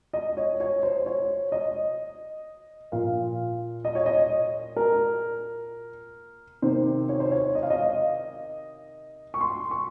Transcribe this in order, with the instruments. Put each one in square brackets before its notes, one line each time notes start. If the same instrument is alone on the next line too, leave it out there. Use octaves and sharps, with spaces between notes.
[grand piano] D#5
C#5
C#5
C5
C#5
D#5
A#2 F3 F5
D#5
C#5
D#5
A#4
C3 D#3 C5
C#5
C5
C#5
D#5
F5
D#5
C#6
C6
C#6